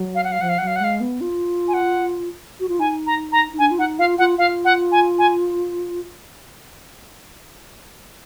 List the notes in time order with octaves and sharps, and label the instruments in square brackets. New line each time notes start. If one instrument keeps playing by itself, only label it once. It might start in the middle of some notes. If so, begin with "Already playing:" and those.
Already playing: [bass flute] F#3
[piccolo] F5
F#5
F5
[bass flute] F3 [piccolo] F#5
[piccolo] F5
[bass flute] F#3 [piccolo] F#5
[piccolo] F5
F#5
[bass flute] G#3 [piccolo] F5
[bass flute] B3
F4
[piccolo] G#5
F#5
[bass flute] F#4
F4
[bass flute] D#4 [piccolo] G#5
[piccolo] A#5
A#5
[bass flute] D#4
[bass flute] D4 [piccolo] G#5
[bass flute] F4
[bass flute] D#4 [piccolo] F#5
[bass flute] F4 [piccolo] F5
[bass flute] F4 [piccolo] F#5
[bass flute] F4 [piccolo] F5
[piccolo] F#5
G#5
G#5